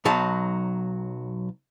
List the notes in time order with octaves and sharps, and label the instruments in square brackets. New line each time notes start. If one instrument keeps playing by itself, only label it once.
[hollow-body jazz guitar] B1 F#3 D#4 A5